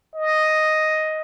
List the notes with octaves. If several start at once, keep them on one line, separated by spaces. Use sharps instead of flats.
D#5